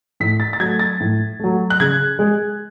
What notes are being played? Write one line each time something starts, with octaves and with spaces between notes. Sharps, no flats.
A2 B6
A6
A6
F#3 A3 G#6
A6
A2
F#3 A3
F#6
C#3 G#6
G#3